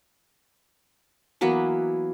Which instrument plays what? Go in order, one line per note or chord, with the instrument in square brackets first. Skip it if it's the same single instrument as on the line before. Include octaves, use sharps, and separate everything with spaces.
[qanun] E3 F#3 A#3 B3